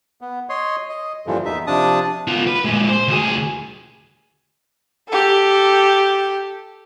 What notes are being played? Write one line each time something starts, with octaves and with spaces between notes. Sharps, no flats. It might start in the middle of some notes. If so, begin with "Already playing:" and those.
B3
C#5 D#5 C6
D#5
G2 A#2 D3 E3 F3
E2 D#4 E5
C3 F3 D4 A5 D#6
B3 F4
B4
A#2 G#3
C5
D2 G#4
G4 A4